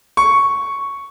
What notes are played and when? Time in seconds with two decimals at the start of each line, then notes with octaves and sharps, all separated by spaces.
0.17 C#6